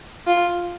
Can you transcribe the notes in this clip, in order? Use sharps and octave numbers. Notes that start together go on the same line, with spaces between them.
F4